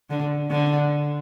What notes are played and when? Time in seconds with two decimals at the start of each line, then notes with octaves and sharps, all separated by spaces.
0.10 D3
0.51 D3